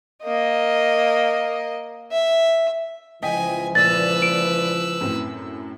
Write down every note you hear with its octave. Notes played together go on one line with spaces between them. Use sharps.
A#3 D#5
E5
C#2 E3 F3 D#5 G5 G#5 B6
A#2 B4 D5 E6 A6
D7
F#2 A2 C4